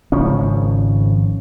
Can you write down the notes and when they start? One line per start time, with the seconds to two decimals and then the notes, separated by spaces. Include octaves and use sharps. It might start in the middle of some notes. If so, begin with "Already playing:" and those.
0.12 G#1 C#3 F3 C#4